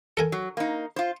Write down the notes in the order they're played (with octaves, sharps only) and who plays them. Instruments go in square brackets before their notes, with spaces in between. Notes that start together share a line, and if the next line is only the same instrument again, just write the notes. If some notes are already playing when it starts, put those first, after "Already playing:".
[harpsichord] A4 A#4 G#5
[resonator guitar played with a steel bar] F#3
A#3 D#4
F4 C5